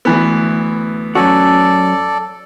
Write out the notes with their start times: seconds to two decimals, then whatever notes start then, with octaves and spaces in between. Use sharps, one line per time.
0.05 D2 E3 B3
1.15 F#2 C#4 F#4 A4 D5